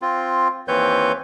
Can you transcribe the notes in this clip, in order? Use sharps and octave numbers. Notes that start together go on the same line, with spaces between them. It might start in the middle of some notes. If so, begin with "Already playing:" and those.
C4 F4
D#2 E3 C4 B4 C#5 G6